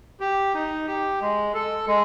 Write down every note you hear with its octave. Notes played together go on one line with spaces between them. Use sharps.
G4
D#4
G4
G#3
A4
G#3